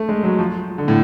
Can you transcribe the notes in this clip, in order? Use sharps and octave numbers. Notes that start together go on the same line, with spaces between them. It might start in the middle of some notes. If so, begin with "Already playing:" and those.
Already playing: A3
G#3
F#3
F3
D3
A2